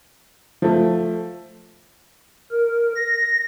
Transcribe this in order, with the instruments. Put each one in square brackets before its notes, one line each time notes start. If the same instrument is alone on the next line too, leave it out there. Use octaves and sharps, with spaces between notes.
[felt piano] F3 A3
[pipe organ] A#4
A#6